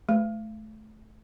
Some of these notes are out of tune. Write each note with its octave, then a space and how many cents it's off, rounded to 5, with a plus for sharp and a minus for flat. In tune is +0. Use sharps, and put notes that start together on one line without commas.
A3 -25